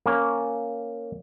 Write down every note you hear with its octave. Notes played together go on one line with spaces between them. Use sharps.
A#3 C#4